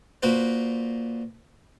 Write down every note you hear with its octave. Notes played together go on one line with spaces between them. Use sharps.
A#2 A#3 F#4 B4 C5